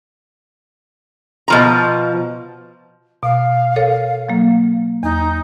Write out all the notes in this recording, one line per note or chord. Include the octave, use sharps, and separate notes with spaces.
B2 F3 A#5
B2 F5
A4 A#4 C#5
F#3 A#3
E2 D#4